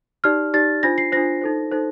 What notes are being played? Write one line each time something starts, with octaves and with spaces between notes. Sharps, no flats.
D#4 G4 D5 F6
D#4 G4 D5 A6
D4 F4 C5 A#6
C7
D4 F4 C5 A#6
D#4 A4 C5
D#4 A4 C5